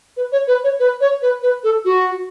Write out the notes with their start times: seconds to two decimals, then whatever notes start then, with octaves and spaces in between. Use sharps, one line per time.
0.17 B4
0.32 C#5
0.48 B4
0.64 C#5
0.80 B4
1.01 C#5
1.22 B4
1.43 B4
1.64 A4
1.85 F#4